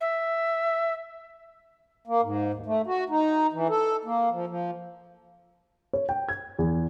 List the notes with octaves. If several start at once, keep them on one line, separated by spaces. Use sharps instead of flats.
E5
A#3
G#2
D#2
A3
F#4
D#4
E3
A4
A#3
F3
F3
C#5
G5
G#6
E2